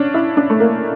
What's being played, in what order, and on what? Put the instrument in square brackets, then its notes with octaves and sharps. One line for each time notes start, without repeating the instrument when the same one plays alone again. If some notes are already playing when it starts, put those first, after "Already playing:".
Already playing: [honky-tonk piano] C#4 D4
E4
D4
A3
A#3